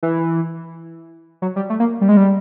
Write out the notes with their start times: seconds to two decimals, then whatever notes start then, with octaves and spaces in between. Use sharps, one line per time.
0.03 E3
1.42 F#3
1.56 G3
1.70 A3
1.80 A#3
2.01 G3
2.09 G#3
2.17 G3